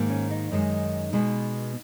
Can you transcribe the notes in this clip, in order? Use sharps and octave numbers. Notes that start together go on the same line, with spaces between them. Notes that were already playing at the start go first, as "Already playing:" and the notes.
Already playing: G#2 D#3 A#3
C#4
D#4
F#2 D#3 G#3
B2 G#3 B3